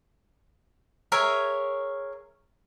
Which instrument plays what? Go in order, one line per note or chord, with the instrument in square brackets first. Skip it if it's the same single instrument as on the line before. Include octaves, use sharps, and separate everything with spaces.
[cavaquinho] G#4 A#4 C#5 E5